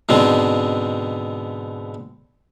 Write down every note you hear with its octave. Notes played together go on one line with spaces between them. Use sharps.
G#2 B2 D3 C4